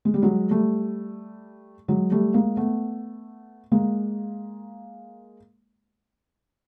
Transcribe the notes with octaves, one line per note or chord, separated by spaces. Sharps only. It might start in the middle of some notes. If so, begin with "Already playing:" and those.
G#3
G3
F#3 G#3
G3 A3
F#3 G#3
G3 A3
G#3 A#3
A3 B3
G#3 A#3